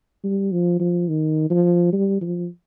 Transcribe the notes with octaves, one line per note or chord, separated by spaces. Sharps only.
G3
F3
F3
D#3
F3
G3
F3